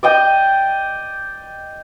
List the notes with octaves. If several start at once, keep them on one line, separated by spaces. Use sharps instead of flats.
D5 D#5 G5